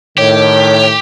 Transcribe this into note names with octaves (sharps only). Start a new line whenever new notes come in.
A2 D#3 G4 C#5